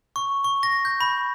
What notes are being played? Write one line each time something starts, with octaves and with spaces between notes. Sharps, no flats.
C#6
C#6
A#6
G6
B5